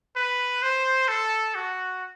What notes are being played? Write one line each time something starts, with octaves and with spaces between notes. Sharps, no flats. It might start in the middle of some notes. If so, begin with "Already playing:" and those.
B4
C5
A4
F#4